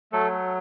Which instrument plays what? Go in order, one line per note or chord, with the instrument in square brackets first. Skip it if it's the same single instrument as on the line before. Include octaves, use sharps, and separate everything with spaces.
[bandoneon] F#3 A3 A4